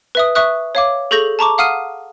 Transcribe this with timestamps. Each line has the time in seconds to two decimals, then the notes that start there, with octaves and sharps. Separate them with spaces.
0.15 B4 E5 D#6
0.35 E5 C#6 D#6 F#6
0.75 C#5 F5 D6
1.11 G#4 A4 C#6 G6 A#6 F#7
1.39 A5 A#5 C#6 D6
1.58 F5 F#5 D#6 F6 C7 D#7